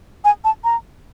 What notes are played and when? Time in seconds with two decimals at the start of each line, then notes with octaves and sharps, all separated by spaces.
0.25 G#5
0.45 A5
0.64 A#5